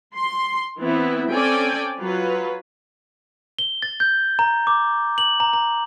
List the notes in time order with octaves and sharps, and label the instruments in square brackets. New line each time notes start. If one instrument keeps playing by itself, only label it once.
[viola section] C6
E3 B3 C4 E4
C4 C#4 A4 D5 G5 G#5
F#3 F4 B4
[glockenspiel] G7
A6
G6
A#5
D6
F#7
A#5
A#5